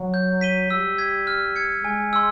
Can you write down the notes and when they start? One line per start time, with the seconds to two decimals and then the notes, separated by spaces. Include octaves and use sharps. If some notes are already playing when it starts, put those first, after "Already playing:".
Already playing: F#3
0.14 G6
0.41 B6 D#7 G7
0.70 G3 E6
0.98 G#6 B6
1.27 F6
1.56 G#6 C#7
1.84 G#3 G#5
2.13 C6 E6